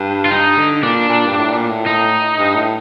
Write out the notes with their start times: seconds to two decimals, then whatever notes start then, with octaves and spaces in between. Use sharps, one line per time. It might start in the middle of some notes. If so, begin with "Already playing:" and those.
Already playing: G2
0.25 F4
0.31 G2 D#4
0.57 D3
0.83 A#2 D4
1.09 A#2
1.26 G2
1.38 A2
1.52 A#2
1.69 A2
1.86 A2 D#4
2.38 G2
2.55 A2